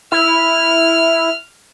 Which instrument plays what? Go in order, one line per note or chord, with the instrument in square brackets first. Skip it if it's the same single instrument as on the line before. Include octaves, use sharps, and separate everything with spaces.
[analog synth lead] E4 [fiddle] F6